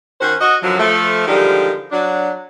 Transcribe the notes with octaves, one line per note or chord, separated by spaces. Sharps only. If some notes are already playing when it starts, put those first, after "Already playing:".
D#3 C#4 F#4 C5
F#4 D#5
F#2 D3 F3 F#3
F3 A3
D3 D#3 F3 G3 G#3 G4
F#3 D4